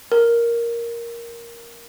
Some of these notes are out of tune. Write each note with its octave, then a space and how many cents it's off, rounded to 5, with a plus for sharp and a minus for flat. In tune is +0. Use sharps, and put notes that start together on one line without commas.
A#4 +5